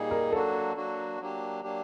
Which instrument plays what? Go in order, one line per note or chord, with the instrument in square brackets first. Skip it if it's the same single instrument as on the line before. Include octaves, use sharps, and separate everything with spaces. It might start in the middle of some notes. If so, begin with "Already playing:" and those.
Already playing: [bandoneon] A#2 G3 A#3 D#4 G#4
[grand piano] A#4
[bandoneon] F#3 A#3 D4 F#4 [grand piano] A4
[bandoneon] F#3 A#3 D4 F#4
F#3 A#3 D4 G4
F#3 A#3 D4 G4